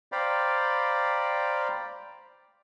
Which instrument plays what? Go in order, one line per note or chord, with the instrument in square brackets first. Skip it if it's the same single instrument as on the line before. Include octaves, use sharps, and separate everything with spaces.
[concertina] C5 D5 F5 G5 A#5 B5